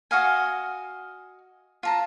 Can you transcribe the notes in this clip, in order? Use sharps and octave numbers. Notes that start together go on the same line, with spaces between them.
F#4 D#5 F5 G#5
F4 A5 A#5